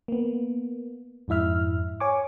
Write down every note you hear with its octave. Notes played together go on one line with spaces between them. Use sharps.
A#3 B3
F2 G#2 E4 E5 F6
C#5 G#5 C#6 D6